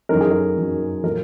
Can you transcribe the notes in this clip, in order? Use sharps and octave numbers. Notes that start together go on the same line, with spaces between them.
F#2 D#3 F#3 A#4
G#4
A#4
F#2 D#3 F#3
A#2 F#3 A#4